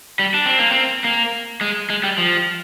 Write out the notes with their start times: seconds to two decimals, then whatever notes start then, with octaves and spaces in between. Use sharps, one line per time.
0.19 G3
0.34 D4
0.46 C4
0.59 A#3
0.70 C4
1.05 A#3
1.61 G#3
1.90 G#3
2.04 G3
2.18 F3